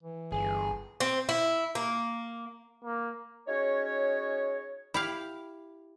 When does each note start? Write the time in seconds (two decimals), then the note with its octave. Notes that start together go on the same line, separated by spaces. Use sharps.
0.03 E3
0.32 G1 G#4
1.00 C4
1.29 E4
1.75 A#3
2.84 A#3
3.48 C#4 D#4 F#4 G#4 C#5
4.94 E4 G4 F5